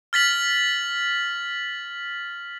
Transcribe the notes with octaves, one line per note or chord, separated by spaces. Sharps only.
F6 A6 B6 F#7